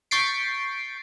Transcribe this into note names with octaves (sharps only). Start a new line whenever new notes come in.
C#6 G6 A6 B6 C7 D7